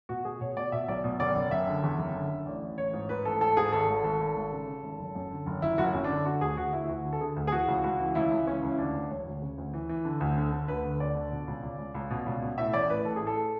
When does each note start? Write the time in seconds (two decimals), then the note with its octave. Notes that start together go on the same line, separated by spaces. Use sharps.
0.09 B2 F#4
0.25 B2 G#4
0.41 B2 C#5
0.56 B2 D5
0.72 B2 E5
0.88 B1 D5
1.04 B2
1.20 F#1 D5
1.36 F#1
1.51 F#1 E5
1.67 D3
1.83 E2
1.99 F#1
2.15 D3
2.30 D3
2.46 A1 D5
2.62 A1
2.78 A1 C#5
2.93 G#2
3.09 G#2 B4
3.25 A1 A4
3.41 G#2 A4
3.57 G#2 G#4
3.72 G#1 A4
3.88 G#1
4.04 G#1 A4
4.20 G#1
4.36 G#1
4.52 C#3
4.67 C#3
4.83 G#1
4.99 F#1
5.15 F#2
5.31 D3
5.46 F#1
5.62 F#1 E4
5.78 F#1 F#4
5.83 E4
5.94 F#2
6.04 D4
6.10 D3
6.25 D3 F#4
6.41 D2 G#4
6.57 D2 F#4
6.73 D2 E4
6.84 E4
6.89 D2 F#4
7.05 D3
7.13 A4
7.21 D3 G#4
7.36 D2
7.47 G#4
7.52 E3 F#4
7.68 C#2
7.84 C#2 F#4
7.99 E3
8.15 C#2 E4
8.31 C#2
8.47 E3 C#4
8.63 C#2
8.72 E4
8.78 D2 D4
8.94 D2
9.10 E1 C#5
9.26 D2
9.42 C#3
9.58 D2
9.73 E3
9.89 E3
10.05 D3
10.20 D2
10.37 D3
10.52 D3
10.68 D2 B4
10.84 D3
11.00 D2 D5
11.15 D3
11.31 B2
11.47 C#2
11.63 C#2
11.78 C#2
11.95 C#2
12.10 B2
12.26 C#2
12.42 B2
12.58 A2 E5
12.73 A1 D5
12.89 A2 B4
13.05 A1 A4
13.16 G#4
13.21 A2
13.27 A4